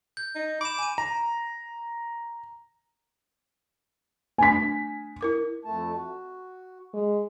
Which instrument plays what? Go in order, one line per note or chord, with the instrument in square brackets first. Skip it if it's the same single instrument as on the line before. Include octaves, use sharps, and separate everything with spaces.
[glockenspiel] G6
[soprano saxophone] D#4
[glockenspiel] B5 E7 [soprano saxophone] D6
[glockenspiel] G#5 D#7
[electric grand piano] A#5
[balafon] A3 D4 [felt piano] G#5 B6
[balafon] E4 A#4 D6
[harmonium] F2 A3 A5
F#4
[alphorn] G#3